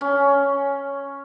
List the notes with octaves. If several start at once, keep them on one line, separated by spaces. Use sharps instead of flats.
C#4